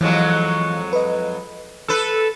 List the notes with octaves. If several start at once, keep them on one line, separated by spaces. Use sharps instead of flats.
F2 E3 F#3 G#3
B4 D#5
A4 B4 E6